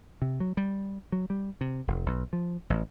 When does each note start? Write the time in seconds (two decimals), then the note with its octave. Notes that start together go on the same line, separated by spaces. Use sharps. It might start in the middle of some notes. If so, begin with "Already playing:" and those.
0.22 C3
0.40 F#3
0.57 G3
1.12 F#3
1.30 G3
1.61 C3
1.87 F1
2.06 B1
2.33 F3
2.70 A1